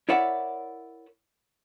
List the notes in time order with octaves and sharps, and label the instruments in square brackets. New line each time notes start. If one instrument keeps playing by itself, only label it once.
[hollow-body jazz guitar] E4 A#4 C#5 D5 E5 F#5